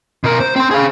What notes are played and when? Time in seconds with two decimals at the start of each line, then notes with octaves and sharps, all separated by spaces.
0.24 B2 A#4
0.40 C5
0.56 C4 C6
0.71 G#4 F5